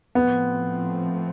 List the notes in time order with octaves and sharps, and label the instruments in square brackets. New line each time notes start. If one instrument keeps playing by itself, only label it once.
[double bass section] A2 F3 A3 C4 [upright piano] B3